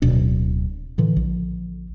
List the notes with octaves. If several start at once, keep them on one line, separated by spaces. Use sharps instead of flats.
D1 B2 D4
A2 D3 E3
A#1